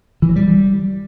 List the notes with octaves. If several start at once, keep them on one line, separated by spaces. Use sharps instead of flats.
E3
F#3
G3